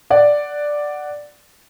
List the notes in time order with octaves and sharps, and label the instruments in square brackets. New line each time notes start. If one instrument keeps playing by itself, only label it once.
[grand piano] D5 F#5